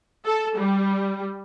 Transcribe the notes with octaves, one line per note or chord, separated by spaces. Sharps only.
A4
G3